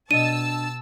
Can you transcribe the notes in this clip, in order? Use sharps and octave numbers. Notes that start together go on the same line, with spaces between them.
B2 D4 D#5 A5 E6 D#7